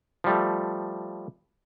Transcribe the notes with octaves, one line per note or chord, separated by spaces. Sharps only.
F3 G3 A3